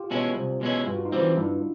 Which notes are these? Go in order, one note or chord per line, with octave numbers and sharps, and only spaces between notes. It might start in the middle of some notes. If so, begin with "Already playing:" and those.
Already playing: F4 G4
B2 G#3 C#4 E4
C2
B2 G#3 C#4 E4
G2 F4
F#4
D#4 F4
E3 G3 C4
G2 D4 E4